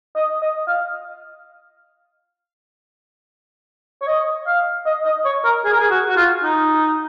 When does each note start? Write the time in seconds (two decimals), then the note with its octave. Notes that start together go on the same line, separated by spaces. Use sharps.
0.16 D#5
0.42 D#5
0.68 F5
4.02 C#5
4.08 D#5
4.47 F5
4.86 D#5
5.05 D#5
5.25 C#5
5.45 A#4
5.65 G#4
5.73 A#4
5.80 G#4
5.91 F#4
6.09 F#4
6.17 F4
6.44 D#4